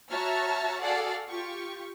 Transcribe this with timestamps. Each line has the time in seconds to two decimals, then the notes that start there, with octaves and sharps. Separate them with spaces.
0.11 F#4 C#5 E5 A5 A#5 F6
0.82 F#4 G#4 A4 D5 F5 F#5
1.29 F4 G4 C#6